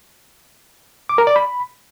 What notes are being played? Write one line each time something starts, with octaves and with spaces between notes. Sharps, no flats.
D6
A#4
D5
B5